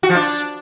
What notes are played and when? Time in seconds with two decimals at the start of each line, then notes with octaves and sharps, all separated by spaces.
0.03 F#4
0.09 F3
0.15 D4